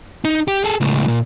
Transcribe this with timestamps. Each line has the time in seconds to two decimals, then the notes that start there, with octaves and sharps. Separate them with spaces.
0.25 D#4
0.48 G4
0.64 G#4 A4
0.81 C#2 A2
1.08 A#2